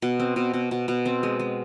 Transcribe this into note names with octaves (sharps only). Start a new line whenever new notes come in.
B2
C4
B2
B2
B2
B2
C4
G#3
G#3